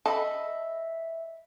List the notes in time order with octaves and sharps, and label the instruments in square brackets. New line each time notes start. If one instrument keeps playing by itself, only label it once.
[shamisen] A4 [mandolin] D#5 E5 B5